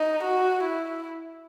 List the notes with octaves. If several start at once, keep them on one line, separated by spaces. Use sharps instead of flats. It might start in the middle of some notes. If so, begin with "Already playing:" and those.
Already playing: D#4
F#4
E4